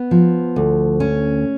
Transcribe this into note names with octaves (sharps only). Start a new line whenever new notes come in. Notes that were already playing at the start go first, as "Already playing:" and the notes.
Already playing: B3
F3
D2
C#4